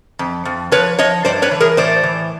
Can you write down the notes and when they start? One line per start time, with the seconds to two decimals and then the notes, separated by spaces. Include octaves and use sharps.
0.19 F2
0.45 F2
0.72 F3 B4 C#5
0.99 F3 C#5 D#5
1.25 G2 C5 D5
1.42 B4 C#5
1.51 E3
1.60 G#4 A#4
1.77 A2 C5 D5
2.03 E3